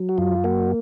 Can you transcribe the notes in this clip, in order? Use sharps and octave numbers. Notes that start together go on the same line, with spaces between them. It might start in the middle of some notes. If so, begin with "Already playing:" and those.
Already playing: F#3
F#4
F#2 F4
A#3 F#4